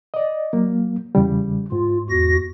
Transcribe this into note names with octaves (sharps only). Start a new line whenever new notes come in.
D5 D#5
F#3 A#3
E2 C#3 G3
G#2 F4
E2 F#4 A#6